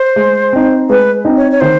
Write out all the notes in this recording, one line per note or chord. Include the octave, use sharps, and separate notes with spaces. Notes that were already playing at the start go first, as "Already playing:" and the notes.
Already playing: C5
G#3
C4 D#4
G#3 B4
C4 D#4
C#5
C#5
D#3 C5